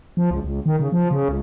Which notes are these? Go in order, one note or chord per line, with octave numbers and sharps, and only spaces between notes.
F3
C#2
C#2
D#3
C#3
F3
C#3
C#2